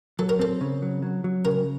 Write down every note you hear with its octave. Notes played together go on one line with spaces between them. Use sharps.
F#3 A4
A#4
C4 A4
C#3
F#3
F#3
F#3
C#3 A#4